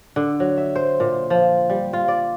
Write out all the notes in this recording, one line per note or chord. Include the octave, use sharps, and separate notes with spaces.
D3
F#3
E5
C5
A#2
F3
G3
F4
D5